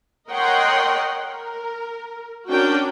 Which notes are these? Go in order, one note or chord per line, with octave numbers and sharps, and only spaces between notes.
A#4 C#5 D#5 F#5 G5 C6
A#4
C#4 D4 F#4 A#4 G5